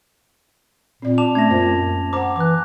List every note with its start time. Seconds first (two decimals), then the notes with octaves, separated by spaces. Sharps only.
1.02 A#2 C4 D5
1.18 A5 D6 F7
1.35 A3 C#4 G#6 A#6
1.49 F#2 A#3 F4 C5
2.13 C5 F#5 A#5 D6
2.36 E3 D6 F#6